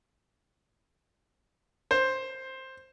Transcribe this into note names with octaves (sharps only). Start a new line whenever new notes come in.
C5